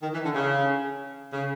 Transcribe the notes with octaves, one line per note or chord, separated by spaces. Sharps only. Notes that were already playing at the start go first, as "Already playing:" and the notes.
D#3
E3
D3
C#3
C#3